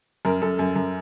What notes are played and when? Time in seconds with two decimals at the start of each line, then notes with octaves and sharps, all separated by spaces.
0.25 F#2 A#4
0.42 F#2 A4
0.59 F#2
0.76 F#2